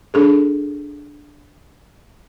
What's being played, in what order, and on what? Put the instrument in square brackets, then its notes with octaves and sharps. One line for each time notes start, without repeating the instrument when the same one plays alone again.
[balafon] D4 G#4 A4